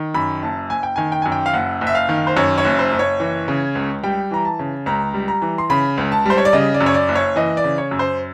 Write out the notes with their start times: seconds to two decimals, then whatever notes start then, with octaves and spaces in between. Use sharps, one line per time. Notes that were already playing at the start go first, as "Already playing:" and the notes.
Already playing: D#3
0.14 F#2 B5
0.42 F#1 A5
0.70 F#1 G#5
0.83 G5
0.96 D#3 G#5
1.12 G5
1.22 F#2 G#5
1.32 G5
1.46 F5
1.53 F#1 F#5
1.81 F#1
1.87 E5
1.95 F5
2.09 D#3
2.27 C5
2.37 F#2 C#5
2.58 C#5
2.65 F#1
2.79 C5
2.92 F#1
2.99 C#5
3.20 E3
3.48 C#3
3.75 C#2
4.03 G3 G5
4.31 E3 A#5
4.45 A5
4.59 C#3
4.86 C#2 A#5
5.14 G3
5.28 A#5
5.42 E3
5.58 C6
5.70 C#3 B5
5.98 C#2
6.12 A5
6.26 G3 C5
6.38 C#5
6.45 D5
6.53 C#3 D#5
6.74 D5
6.81 F#2
6.86 C#5
6.94 D5
7.09 F#1
7.15 C#5
7.36 E3 D#5
7.57 D5
7.64 C#3
7.78 C#5
7.91 F#2
7.99 C5